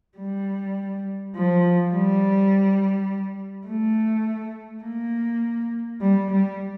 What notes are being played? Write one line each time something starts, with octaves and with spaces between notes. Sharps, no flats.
G3
F3
G3
A3
A#3
G3
G3